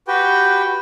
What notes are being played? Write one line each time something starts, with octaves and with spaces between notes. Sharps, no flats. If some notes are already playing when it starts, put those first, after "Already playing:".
F#4 G4 B4 G5